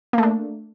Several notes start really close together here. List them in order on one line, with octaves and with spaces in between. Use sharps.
A#3 A3 D4